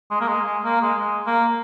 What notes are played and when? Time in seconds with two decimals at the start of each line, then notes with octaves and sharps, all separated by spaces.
0.11 G#3
0.20 A#3
0.28 G#3
0.46 G#3
0.64 A#3
0.81 G#3
0.99 G#3
1.27 A#3